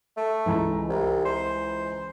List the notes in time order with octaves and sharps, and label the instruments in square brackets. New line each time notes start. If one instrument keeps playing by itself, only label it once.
[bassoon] A3
[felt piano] C#2 E3 A#5
[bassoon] C2
C5